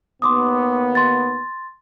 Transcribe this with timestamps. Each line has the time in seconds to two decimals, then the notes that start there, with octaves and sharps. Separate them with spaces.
0.22 D#2 B3 C6 D6 D#6
0.95 C6 A6